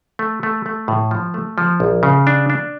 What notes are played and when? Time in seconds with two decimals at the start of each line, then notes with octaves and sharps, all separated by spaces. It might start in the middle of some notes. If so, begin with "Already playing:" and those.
0.19 A3
0.43 A3
0.66 A3
0.88 A2
1.11 F3
1.34 A3
1.58 F3
1.80 A#1
2.03 C#3
2.27 D4
2.50 D4